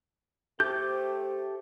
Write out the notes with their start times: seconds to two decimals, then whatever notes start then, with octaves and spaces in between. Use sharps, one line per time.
0.60 A3 G4 A4 C5 G5 D6 G6